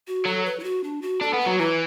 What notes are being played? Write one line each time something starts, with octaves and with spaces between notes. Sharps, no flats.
F#4
F#3 A4
B4
E4
F#4
D4
F#4
D4 A4
B3
B4
F#3
E3 B4